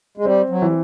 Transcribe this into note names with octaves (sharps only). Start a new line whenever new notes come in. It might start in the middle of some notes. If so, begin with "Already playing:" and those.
G#3
G3 C4
F#3
E3
G3